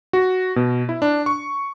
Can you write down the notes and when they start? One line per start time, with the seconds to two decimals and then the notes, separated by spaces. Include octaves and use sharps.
0.13 F#4
0.56 B2
0.89 E4
1.02 D4
1.26 C#6